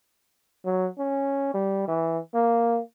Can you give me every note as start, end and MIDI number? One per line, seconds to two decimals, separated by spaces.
0.65 0.88 54
0.98 1.50 61
1.54 1.85 55
1.88 2.18 52
2.34 2.80 58